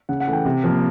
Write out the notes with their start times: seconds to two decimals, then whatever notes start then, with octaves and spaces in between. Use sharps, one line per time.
0.09 C#3 F#5
0.20 F#5
0.27 E3 A3
0.33 G5
0.45 C3
0.64 F3 A#3